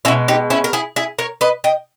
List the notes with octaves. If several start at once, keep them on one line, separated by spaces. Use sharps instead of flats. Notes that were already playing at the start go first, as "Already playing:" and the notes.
B2 G#3 C#4 E4
D#4 G4
C#4 E4
A#4
E4 G#4
E4 G#4
A#4 C#5
B4 D#5
D#5 G5